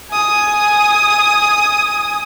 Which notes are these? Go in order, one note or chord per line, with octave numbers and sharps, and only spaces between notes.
G#5 D#6